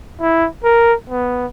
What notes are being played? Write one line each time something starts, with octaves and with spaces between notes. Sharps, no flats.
E4
A#4
B3